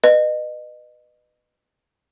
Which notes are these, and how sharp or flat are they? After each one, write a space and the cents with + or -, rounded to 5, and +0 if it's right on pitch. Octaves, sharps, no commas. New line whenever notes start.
B4 +0 D#5 -30